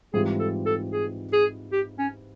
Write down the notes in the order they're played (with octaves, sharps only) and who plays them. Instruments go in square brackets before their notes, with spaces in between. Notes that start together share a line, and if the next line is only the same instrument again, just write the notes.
[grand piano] G#2 E3 G3 C4 F4 [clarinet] G#4
[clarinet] A4
A4
G#4
G#4
G4
C#4